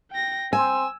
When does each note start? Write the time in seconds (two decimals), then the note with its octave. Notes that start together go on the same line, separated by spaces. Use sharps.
0.11 G5 A#6
0.53 C4 G#5 E6